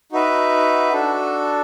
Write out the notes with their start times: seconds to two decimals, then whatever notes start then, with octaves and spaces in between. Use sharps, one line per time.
0.12 D#4 F#4 B4 E5
0.93 D4 F#4 A4